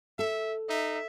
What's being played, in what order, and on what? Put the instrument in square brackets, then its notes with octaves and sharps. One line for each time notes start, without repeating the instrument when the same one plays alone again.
[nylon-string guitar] A4 [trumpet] E5
[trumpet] D#4 [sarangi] E5